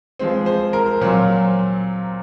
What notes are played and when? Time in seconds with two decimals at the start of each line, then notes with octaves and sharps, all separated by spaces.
0.19 F3 G#3 C4
0.46 C5
0.73 A#4
1.01 A#2 F#3 C4